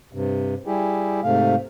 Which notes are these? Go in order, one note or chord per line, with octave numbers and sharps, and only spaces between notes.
G2 C3
G3 E4 G4 G#4
G#2 C3 A3 F5